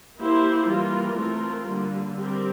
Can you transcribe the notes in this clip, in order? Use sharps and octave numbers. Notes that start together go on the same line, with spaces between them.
A#3 E4 G4 C5
E3 G3 A#3 F4 A#4
A3 C4 F4 A#4
D3 G3 A#3
G3 C4 G4 A#4